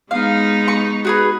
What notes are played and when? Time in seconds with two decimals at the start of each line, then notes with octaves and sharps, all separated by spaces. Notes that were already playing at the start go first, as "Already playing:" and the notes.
0.11 G#3 B3 D#4 F5
0.68 C#6
1.05 F#4 G#4 B4